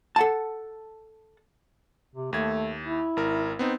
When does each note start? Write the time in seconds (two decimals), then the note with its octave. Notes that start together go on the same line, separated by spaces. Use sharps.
0.16 A4 F#5 A5
2.15 C3
2.33 D#2 A3 G#6
2.83 E4
3.17 G#1 A#4
3.59 B3 C4 D#4